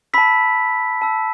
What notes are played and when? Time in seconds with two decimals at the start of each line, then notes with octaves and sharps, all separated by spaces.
0.13 A5 B5 E6 B6
1.02 A5 E6